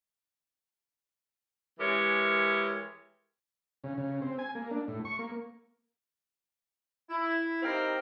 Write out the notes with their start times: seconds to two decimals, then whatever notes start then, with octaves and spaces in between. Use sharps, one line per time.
1.79 E3 G#3 G4 A#4 C#5
3.84 C#3
3.98 C#3
4.22 C4
4.39 G#5
4.55 A#3
4.71 D4
4.88 A2
5.05 C#6
5.19 A#3
7.10 E4
7.62 C4 D#4 G4 A#4 F5 G5